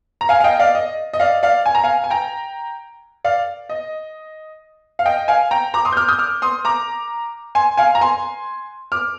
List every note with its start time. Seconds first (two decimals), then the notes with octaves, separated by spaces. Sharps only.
0.21 A#5
0.29 F5 G#5
0.40 F5
0.44 D#5 G5
0.59 D5 F5
0.75 D#5
1.13 D#5
1.20 D5 F5
1.43 D5 F5
1.66 G#5
1.75 A#5
1.84 F5 G#5
2.04 G#5
2.10 G5 A#5
3.24 D5 F5
3.69 D#5
4.99 F5
5.06 D#5 G5
5.28 F5 G#5
5.51 G5 A#5
5.74 A#5 D6
5.85 C6 D#6
5.92 G6
5.97 D6 F6
6.08 D#6 G6
6.19 D6 F6
6.42 C6 D#6
6.65 A#5 D6
7.55 G#5 C6
7.77 F5 G#5
7.95 A#5
8.01 G#5 C6
8.92 D6 F6